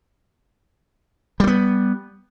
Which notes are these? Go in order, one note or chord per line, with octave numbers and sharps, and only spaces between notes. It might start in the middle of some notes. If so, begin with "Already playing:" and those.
G3 A3 B3